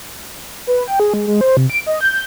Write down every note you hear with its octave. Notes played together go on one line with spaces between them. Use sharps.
B4
G5
G#4
G#3
G#3
C5
C3
D7
D#5
G6